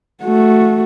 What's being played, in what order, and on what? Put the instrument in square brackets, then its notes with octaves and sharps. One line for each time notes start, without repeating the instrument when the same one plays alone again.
[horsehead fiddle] A3 F#4